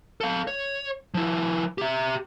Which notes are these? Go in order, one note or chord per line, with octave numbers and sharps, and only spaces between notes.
A4 F5
C#5
F3 E4
G4 E5